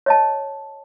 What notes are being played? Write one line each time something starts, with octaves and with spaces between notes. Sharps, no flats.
C#5 D#5 A5